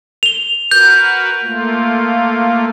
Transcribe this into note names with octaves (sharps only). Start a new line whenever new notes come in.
F7 G7
F#4 A#4 B4 G6
A3 A#3 F4